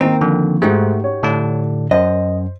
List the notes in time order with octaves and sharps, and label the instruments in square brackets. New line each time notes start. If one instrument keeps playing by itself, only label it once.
[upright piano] D#3 A#3 [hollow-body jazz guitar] C4 [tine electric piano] D#4
[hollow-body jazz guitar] F2 [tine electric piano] D3
[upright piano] G#2 [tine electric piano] A3 [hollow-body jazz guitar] D#4 F#4 G4
[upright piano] C#5
[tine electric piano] A2 D3 D4
[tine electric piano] F#2 [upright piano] C5 [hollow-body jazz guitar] D#5